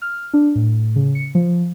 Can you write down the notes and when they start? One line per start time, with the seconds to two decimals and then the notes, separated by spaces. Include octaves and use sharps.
0.02 F6
0.34 D4
0.55 A2
0.96 C#3
1.15 C#7
1.35 F3